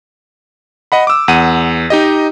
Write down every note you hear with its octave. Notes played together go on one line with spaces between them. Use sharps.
D#5 F#5 B5
D6 E6
E2 F#5 D#7
D#4 G4 D#5